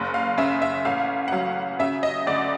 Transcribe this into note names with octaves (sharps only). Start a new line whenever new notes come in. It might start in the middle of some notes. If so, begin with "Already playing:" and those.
Already playing: F#1
F5
C#3 E5
E5
A1 F5
F#5
F#3 F5
C#3 E5
D#5
D2 D5